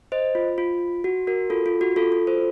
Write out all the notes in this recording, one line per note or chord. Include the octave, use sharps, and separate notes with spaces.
C5 D#5
F4
F4
F#4
F#4 A#4
F4 A4
F4
F#4
F4 A4
F4
A4 C5